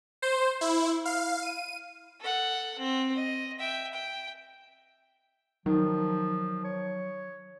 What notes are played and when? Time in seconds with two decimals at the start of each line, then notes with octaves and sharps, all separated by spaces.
0.22 C5
0.61 E4
1.05 F5
1.43 D#7
2.20 A4 F#5
2.78 C4
3.13 D#5
3.59 E5 G5
3.93 G5
5.66 D#3 F3 F#3
6.64 C#5